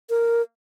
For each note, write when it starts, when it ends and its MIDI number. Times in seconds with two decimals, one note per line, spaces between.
0.10 0.42 70